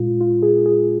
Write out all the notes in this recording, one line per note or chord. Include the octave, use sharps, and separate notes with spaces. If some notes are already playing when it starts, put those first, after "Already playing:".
Already playing: A#2 G#3 F4
F4
G#4
G#4